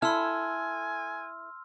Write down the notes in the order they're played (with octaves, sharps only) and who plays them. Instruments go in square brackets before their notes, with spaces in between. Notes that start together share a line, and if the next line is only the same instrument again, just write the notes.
[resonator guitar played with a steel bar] E4 A4 [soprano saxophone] G#5 [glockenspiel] C6 E6 F6